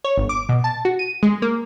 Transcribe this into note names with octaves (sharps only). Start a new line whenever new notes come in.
C#5
G1
D6
B2
A5
F#4
D#7
G#3
A#3